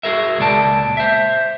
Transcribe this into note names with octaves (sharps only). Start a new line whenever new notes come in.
F#4 G#4 A#4 E5
C#2 A#2 D5 A5
C5 E5